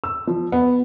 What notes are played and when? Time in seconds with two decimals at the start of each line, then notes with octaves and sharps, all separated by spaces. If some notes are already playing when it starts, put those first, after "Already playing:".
0.04 E6
0.27 F3
0.52 B3